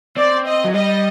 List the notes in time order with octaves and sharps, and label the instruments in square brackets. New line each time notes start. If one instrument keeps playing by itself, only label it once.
[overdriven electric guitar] C4 [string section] D5
[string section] D#5
[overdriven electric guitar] F#3
[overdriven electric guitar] G3 [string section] D#5